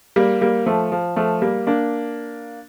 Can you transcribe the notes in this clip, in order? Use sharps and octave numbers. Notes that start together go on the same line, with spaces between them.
G3 A#3
G3 A#3
F3 A3
F3
F3 A3
G3 A#3
A#3 D4